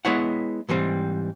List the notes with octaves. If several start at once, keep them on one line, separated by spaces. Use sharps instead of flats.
G#3 B3 E4 C#5 F#5
G#2 E3 G3 C4